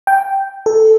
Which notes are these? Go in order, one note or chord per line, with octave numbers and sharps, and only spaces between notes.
G5
A4